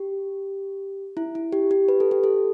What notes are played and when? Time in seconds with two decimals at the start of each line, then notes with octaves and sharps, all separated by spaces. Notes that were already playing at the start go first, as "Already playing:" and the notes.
Already playing: G4
1.17 E4
1.35 E4
1.53 G4
1.71 G4
1.88 B4
2.00 A4
2.11 G4
2.24 A4